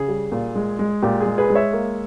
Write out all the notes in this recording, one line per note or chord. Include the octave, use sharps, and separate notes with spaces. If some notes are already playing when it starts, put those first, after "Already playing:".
Already playing: C#3 G#4
G3
A#2
G#3
G#3
A#2 G4
G#4
G#3
G#4 B4
G#3
C#5 E5
A#3